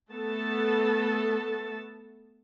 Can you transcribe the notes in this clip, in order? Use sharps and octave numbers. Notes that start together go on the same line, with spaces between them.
A3 B3 A4 A5